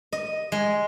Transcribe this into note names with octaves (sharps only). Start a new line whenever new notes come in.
D#5
G#3